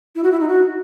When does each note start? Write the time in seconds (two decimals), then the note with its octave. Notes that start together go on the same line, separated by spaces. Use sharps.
0.15 E4
0.24 F#4
0.32 E4
0.40 D#4
0.48 F#4